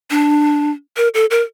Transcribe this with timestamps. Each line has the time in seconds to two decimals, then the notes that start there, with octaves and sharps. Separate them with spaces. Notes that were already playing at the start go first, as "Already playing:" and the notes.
0.10 D4
0.97 A#4
1.14 A4
1.31 A#4